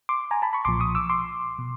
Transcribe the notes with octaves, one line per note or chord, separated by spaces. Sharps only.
C6 D6
G#5 A#5
A5 B5
B5 C#6
B1 A#2 F3 C6 D6
C#6 D#6
D6 E6
C6 D6
B2